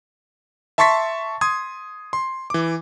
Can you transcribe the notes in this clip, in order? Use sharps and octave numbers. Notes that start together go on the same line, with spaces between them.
E5 A5 C6 C#6 A6 B6
C6 D#6 G#6
C6
E3 D6